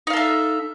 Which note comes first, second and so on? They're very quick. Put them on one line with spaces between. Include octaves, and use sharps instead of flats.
D#4 F5 A4 E5